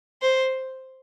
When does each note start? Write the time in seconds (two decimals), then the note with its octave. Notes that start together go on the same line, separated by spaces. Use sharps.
0.22 C5